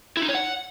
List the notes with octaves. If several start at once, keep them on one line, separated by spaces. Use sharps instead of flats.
E4
D#4
C#5
F#5